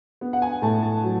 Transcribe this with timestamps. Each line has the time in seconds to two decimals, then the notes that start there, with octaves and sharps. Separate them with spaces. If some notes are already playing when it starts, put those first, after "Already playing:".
0.21 B3
0.33 F#5
0.42 G#5
0.62 A2 A5
0.83 A5
1.03 F#3